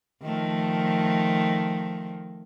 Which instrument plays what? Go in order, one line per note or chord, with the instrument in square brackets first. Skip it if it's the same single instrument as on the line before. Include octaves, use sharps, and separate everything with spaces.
[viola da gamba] D#3 F3 A3